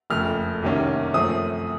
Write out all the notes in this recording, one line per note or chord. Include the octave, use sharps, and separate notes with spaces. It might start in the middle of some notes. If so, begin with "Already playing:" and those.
F#1 F2 C#3 A3 F6
C2 C3 D#3 A#3 C#4
F#2 F3 A3 C4 D#6